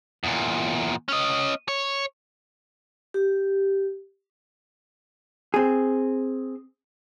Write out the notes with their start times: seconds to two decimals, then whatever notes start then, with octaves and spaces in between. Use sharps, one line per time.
0.24 E2 A#2
1.09 C#4 D#5
1.68 C#5
3.14 G4
5.54 C4 G#4